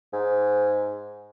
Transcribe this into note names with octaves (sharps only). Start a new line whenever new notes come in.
G#2